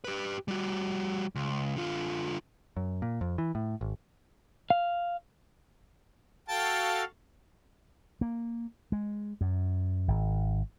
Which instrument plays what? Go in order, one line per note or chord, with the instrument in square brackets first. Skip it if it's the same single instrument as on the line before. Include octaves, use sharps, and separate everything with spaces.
[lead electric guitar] G4 B4
G3 F#4
C#2
D3 F4
[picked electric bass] F#2
A#2
F2
E3
A2
G#1
[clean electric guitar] F5
[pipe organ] F#4 A4 F5 [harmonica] G5 A5
[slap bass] A#3
G#3
F#2
G#1